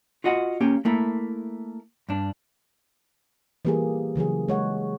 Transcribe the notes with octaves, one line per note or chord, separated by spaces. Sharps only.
F4 F#4 D#5 F#5
A#3 C#4 G4
A3 A#3 E4
G2 D4
E3 G3 A#3 G4 G#4
C#3 E3 F#3 G#4
G#3 C#5 F#5